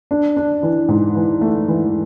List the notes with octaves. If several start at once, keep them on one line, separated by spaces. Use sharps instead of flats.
D4
D4
E3
G#2
E3
A3
E3